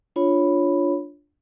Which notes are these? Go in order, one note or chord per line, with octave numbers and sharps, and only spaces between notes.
D4 F4 C#5 B5